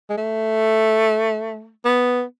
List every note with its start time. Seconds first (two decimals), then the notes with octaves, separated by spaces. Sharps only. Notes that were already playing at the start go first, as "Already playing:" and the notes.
0.10 G#3
0.17 A3
1.85 B3